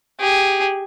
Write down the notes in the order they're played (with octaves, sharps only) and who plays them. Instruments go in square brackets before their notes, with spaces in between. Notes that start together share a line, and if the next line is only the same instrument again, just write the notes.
[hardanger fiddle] G4 G#4